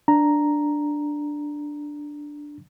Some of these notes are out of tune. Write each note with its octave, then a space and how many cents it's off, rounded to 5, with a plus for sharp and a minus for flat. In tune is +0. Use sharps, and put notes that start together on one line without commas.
D4 +0 A#5 +0